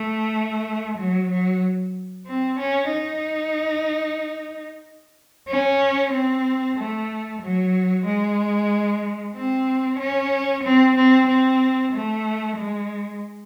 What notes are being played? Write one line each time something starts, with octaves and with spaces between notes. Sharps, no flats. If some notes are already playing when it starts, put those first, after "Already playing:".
Already playing: A3
F#3
F#3
C4
C#4
D#4
C#4
C4
A3
F#3
G#3
C4
C#4
C4
C4
C4
A3
G#3